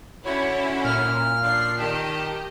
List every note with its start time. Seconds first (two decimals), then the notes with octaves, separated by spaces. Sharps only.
0.25 D3 C#4 E4 F#4 C#5
0.85 A#2 F6
1.42 F3 D4 C7
1.78 D#3 G4 D#5 A5